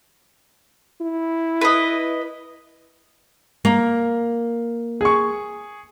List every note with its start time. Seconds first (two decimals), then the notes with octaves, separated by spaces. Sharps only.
1.01 E4
1.61 B4 D#5
3.65 A#3
5.01 G#4 C#6